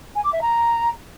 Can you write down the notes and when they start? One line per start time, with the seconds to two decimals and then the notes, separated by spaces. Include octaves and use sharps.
0.15 G#5
0.24 D6
0.33 E5
0.41 A#5